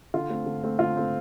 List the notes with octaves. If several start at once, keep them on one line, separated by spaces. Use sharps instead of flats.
D3 F4
A3 C4
D3
A3 C4
D3 F4
A3 C4